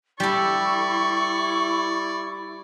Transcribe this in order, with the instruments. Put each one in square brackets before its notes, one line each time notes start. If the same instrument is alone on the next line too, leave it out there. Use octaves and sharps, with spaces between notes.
[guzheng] G3 A4 [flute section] E4 B5 [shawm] D5 [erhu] C#6